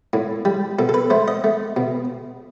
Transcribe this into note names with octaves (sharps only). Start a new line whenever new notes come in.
A2
G3
B2 A4
A4
B4
A3 C5
D#5
A3
B2